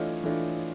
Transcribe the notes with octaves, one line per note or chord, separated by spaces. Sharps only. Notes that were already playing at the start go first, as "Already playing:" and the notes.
Already playing: E3 A3 D4 F4 C#5 D#5
E3 A3 D4 F4